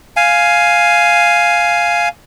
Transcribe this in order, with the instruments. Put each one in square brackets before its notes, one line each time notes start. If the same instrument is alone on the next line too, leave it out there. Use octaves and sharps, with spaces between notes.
[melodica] F5 G#5